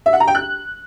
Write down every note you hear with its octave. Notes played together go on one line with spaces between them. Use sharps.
E5
F#5
A#5
G5
F#6